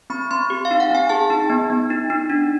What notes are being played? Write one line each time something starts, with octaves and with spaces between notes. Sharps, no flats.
C4 B5
C4 C6
G4
F5
D#4
F#5
C4 G#5
G#4 A5
D#4
B3
B3
D#4
D#4
D4